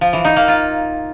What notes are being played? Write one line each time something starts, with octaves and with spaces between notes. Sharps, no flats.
F3
E3
D#4
A#3
F4